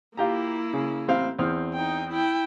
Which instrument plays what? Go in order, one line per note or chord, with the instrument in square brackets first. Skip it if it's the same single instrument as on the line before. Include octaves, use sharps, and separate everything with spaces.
[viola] A#3 E4 [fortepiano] F4 G4 A#5
[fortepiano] C#3
A1 C4 F5
E2 C4 F6
[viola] D#4 G5
E4 G5